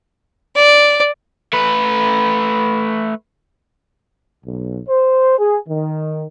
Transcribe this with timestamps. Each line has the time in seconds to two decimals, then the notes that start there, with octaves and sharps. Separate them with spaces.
0.56 D5
1.53 A3 B4
4.45 B1
4.88 C5
5.39 G#4
5.68 D#3